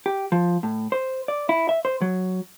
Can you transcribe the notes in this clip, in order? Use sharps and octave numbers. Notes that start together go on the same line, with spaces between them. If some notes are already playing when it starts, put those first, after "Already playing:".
G4
F3
A2
C5
D5
E4
E5
C5
F#3